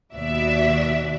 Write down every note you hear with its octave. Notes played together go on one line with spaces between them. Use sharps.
D#2 B2 F#4 D5 E5